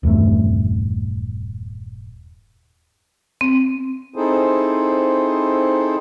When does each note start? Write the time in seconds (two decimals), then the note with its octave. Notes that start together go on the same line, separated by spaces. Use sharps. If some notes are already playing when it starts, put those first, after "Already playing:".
0.03 D#1 E2 G2 A3
3.41 C4
4.16 C4 D#4 E4 G#4 A4 C5